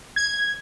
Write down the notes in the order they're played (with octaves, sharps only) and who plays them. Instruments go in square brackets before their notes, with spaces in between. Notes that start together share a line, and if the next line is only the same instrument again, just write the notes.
[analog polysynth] G#6